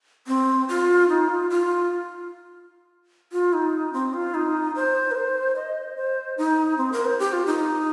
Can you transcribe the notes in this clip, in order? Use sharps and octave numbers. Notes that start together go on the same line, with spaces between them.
C4
F4
D#4
F4
F4
F4
D#4
C4
F4
D#4
C5
A#4
C5
D#5
C5
D#4
C4
A#4
C5
G4
F4
D#4